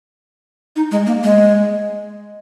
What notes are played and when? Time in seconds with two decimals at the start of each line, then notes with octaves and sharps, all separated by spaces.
0.76 D#4
0.91 G#3
1.07 A#3
1.24 G#3